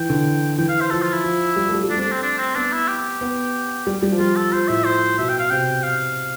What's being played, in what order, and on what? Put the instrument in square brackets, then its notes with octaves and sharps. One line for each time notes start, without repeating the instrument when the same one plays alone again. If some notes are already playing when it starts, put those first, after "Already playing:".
Already playing: [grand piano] E3 [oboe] G5
[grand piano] D3
[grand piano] E3 [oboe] G5
[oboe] F5
C5
[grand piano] F3 [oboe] A4
[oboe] F4
E4
[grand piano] F3
G3
A3
G3
G3
[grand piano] A3 [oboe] D4
[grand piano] C4
[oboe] D4
[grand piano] A3
[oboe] C4
D4
C4
[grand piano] B3 [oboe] D4
[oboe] E4
G4
[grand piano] B3
G3
G3
F3
[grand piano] G3 [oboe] F4
[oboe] A4
[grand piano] F3 [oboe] C5
[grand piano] A2 [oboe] E5
[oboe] C5
[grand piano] B2 [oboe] E5
[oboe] G5
F5
[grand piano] C3 [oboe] G5
[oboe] F5